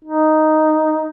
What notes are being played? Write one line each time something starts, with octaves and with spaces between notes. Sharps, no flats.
D#4